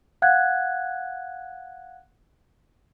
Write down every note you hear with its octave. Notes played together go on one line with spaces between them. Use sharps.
F5 F#5 F#6 G#6